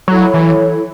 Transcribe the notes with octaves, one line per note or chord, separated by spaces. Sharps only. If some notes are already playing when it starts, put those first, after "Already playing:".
F#3 E4 A4 C#5
E3